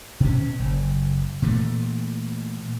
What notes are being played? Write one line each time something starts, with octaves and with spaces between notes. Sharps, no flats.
B2 C#4
F#1
A#2 E3 A3